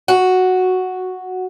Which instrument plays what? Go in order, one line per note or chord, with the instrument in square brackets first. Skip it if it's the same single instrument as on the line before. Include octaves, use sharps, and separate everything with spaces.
[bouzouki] F#4